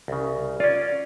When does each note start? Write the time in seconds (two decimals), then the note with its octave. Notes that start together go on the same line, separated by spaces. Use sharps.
0.08 C2 C#3
0.60 C#4 F4 D5